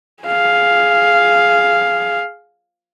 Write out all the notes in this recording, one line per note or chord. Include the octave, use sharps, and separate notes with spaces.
G#4 F5